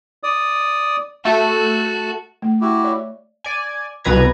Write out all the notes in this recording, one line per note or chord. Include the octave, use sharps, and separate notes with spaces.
D5 D#6
A3 F#4 A5
A3
E4 F#4 G4
C#5 D5 E5
D5 G#5
C2 B2 B4 A#5 G#6